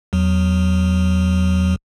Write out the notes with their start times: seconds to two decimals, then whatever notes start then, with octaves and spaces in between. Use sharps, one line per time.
0.13 E2 F#3